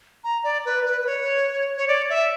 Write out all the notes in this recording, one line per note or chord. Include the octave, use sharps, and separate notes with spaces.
A#5
D5
B4
B4
B4
C#5
C#5
D5
E5